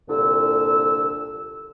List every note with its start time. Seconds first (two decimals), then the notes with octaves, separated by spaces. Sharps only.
0.09 C2 A#2 D3 E6